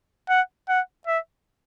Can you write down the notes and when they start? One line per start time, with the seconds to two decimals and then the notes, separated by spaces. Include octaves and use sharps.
0.29 F#5
0.68 F#5
1.07 E5